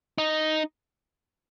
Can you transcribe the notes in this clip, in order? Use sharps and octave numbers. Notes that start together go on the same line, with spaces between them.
D#4